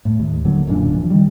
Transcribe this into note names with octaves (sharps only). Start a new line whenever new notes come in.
A2
D#2
D1 D3 F#3 A#3
D1 F#2 A#2 D4
E3 F3
D#3 G3